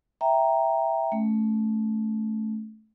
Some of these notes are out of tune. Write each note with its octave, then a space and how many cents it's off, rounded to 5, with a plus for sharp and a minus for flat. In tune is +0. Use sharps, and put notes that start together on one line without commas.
E5 +0 G5 +0 A#5 +0
A3 -15 C#4 +0